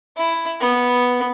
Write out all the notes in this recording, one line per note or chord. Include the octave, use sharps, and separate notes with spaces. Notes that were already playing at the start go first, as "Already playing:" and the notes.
E4
B3